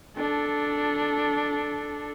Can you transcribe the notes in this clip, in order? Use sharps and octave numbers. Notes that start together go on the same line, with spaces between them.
D4 A4